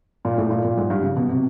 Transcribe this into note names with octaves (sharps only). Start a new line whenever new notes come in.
A#2
A2
A#2
A#2
G#2
G2
C#3
B2
C3